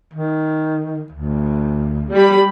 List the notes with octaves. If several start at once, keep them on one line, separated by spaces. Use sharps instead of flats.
D#3
D2
G3 B5